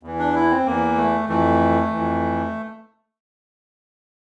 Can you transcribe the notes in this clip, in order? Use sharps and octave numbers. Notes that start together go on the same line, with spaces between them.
E2 E3
D4
E4
C4
E2 E3 A#3
A3
F2 E3 A3
F2 E3